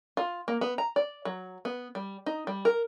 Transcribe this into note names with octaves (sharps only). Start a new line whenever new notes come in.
F4
A#3
B3
A#5
D5
F#3
B3
G3
D#4
G3
A#4